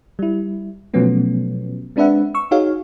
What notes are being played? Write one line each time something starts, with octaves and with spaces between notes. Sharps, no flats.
G3 E4
B2 F3 F#3 A3 B3 C#4
G#3 C4 D4 B4 E5 F#5
C#6 E6
D#4 F#4 G#4 C#5 F5